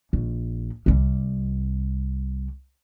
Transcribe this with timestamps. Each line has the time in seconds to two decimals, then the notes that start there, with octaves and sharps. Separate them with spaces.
0.13 A#1
0.86 C2 G3